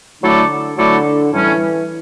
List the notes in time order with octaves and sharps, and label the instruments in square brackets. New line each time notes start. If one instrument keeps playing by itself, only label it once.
[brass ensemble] D3 [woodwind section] F#3 A3 E4 A4 D5
[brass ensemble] D3 [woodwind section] F#3 A3 E4 A4 D5
[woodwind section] A2 G3 C#4 [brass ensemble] E3